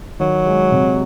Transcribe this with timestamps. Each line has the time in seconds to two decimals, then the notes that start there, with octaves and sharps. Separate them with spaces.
0.20 D#3 F#3
0.46 G#3
0.72 C3